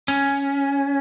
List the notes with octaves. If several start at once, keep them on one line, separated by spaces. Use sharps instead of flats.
C#4